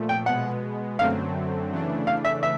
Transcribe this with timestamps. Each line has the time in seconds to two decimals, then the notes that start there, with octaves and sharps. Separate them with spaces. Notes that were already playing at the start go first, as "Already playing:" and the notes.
Already playing: A#2 F3 A3
0.09 G5
0.26 B2 G#3 B3 F#5
0.99 F#2 D3 F#3 A3 C4 F5
1.71 C#3 E3 A3 D4
2.07 F5
2.25 E5
2.43 E5